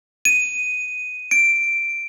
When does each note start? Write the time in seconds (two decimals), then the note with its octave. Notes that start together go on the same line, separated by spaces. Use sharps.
0.25 D#7
1.31 D7